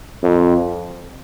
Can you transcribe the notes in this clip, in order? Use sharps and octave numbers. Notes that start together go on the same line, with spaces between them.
F2